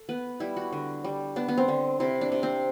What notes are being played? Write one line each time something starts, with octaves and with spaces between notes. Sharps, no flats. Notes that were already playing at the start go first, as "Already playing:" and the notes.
Already playing: A4
B3 B4
G3 E4
F#4
D3
G3
B3 D4
B3
C4
D3
C3 E4
D4
C3
C4